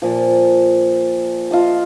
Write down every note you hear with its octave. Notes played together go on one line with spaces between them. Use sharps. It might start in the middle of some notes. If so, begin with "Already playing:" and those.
A#2 F3
F4 D#5 A5